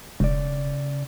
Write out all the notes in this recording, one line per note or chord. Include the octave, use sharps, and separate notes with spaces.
E1 C#3 D5